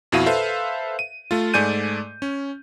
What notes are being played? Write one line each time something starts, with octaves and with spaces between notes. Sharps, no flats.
F2 B2 E4 F#4 F5 D#7
A4 B4 C5 E5 F5
D#7
A3 F4
G#2 A3 D5 G#5 G6 D#7
C#4